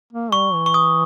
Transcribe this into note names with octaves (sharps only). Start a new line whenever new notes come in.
A#3
G3 C#6
E3
C#6
D#6